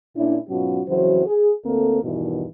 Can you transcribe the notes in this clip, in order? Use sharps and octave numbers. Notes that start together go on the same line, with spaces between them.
A#2 C#4 D4 E4
G#2 B2 F#3 C#4 F4 F#4
F2 C#3 E3 F#3 F#4 C5
G#4
D2 A#3 C4 A4
E2 G2 B2 D#3 E3